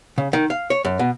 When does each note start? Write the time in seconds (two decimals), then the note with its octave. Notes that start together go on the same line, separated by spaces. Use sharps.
0.18 C#3
0.33 D#3
0.50 F5
0.70 C#5
0.85 F#2
0.99 B2